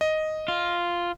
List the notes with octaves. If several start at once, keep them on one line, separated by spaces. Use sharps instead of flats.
D#5
F4